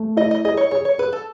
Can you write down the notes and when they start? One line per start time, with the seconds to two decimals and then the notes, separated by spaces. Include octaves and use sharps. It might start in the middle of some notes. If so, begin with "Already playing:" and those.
Already playing: A3
0.17 E4 D#5
0.31 D#5
0.45 G#4 D#5
0.57 C#5
0.71 G#4 C#5
0.85 C#5
0.98 G#4 B4
1.13 A4